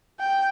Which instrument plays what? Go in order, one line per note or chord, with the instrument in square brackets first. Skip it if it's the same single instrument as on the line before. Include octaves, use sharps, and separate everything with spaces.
[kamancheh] G5